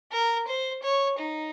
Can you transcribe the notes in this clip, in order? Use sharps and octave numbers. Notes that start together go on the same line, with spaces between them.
A#4
C5
C#5
D#4